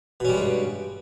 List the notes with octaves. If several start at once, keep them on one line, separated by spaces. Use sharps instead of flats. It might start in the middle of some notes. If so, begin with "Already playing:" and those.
G2 B2 G3 G#3 C#4